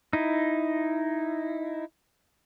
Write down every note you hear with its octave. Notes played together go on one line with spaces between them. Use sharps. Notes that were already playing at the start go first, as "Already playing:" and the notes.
D#4 E4